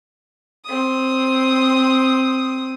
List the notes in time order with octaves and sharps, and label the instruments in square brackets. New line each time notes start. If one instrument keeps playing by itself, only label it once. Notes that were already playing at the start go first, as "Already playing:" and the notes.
[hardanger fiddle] C4 D#6